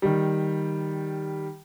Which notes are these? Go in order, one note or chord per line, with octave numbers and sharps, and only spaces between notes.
D#3 G3